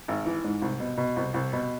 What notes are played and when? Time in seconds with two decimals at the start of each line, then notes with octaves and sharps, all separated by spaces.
0.08 G#1
0.26 E3
0.44 G#2
0.62 C2
0.80 B2
0.97 B2
1.16 C2
1.34 C2
1.53 B2